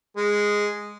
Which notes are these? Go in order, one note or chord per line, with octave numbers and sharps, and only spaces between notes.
G#3